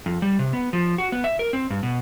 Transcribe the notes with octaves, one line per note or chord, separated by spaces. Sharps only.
F2
G3
C3
B3
F3
F#4
B3
E5
A#4
C4
G2
B2